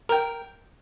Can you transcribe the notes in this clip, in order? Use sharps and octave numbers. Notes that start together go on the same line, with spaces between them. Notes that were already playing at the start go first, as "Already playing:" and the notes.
A#4 G5